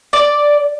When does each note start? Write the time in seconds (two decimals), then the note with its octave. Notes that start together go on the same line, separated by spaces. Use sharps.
0.13 D5